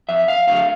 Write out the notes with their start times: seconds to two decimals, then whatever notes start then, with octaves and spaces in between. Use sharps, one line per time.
0.09 F2 E5
0.28 F5
0.47 D3 F#3 A3 F5